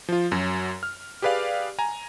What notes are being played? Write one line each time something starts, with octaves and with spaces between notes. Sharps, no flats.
F3 F4
F#2 F#3
F6
G4 G#4 B4 D5 F5
G#5 A#5